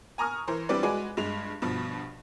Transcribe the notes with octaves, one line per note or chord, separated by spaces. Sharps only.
G#5 A#5 C#6 D#6 F6
E3 A#4 C5
E3 G3 C4 D4 B4 D5
G#3 F#4 B4 D5 G#5
G2 G#3 F7
G2 B2 F3